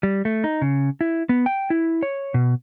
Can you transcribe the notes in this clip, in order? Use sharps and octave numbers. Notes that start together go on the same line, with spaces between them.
G3
A3
D#4
C#3
E4
B3
G5
E4
C#5
B2